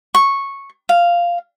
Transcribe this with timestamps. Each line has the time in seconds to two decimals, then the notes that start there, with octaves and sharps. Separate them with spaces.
0.15 C#6
0.89 F5